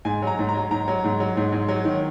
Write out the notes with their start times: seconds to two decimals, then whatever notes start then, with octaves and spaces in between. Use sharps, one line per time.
0.05 G#2 G#5
0.22 F#3 A#5
0.39 G#2
0.49 A#5
0.54 F#3
0.71 G#2 A#5
0.88 F#3
1.04 G#2
1.20 F#3
1.37 G#2
1.52 G#2
1.68 F#3
1.85 D#3